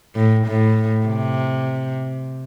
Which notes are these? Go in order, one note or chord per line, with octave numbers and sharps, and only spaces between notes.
A2
A2
C3